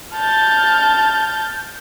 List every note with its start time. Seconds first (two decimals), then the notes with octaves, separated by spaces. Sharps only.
0.15 A5 F6 G6 A6